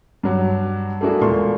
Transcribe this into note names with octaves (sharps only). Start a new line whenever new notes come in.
G2 F#3
A3 A#3 D4 E4 F#4 G#4
E1 A#2 A3 A#3 C6 C#6